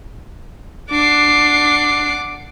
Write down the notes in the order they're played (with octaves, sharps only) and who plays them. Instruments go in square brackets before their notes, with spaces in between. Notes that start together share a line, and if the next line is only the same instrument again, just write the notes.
[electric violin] D4 C7 [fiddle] F#5 D6